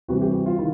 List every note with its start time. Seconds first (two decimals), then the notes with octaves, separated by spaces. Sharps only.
0.08 C3 E3 G3 F#4
0.22 G4
0.34 F#4
0.46 F4
0.58 D#3 E4